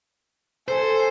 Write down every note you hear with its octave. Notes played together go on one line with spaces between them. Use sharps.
A4 C5 G#5